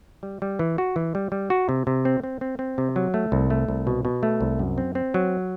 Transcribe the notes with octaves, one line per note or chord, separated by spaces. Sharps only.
G3
G3
E3
F#4
E3
G3
G3
F#4
C3
C3
C4
C4
C4
C4
C3
F#3
A3
C2
A3
C2
B2
B2
A3
C2
F#2
C4
C4
F#3